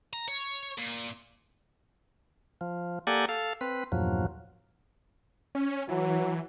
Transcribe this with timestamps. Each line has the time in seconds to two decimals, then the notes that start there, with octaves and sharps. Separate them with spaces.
0.13 A#5
0.28 C#5
0.78 A#2
2.61 F3
3.07 A#3 G4 A4 D5 F#5 G#5
3.29 A4 F5
3.61 C4 B4
3.92 E2 G2 A#2 F3 F#3
5.55 C#4
5.89 E3 F#3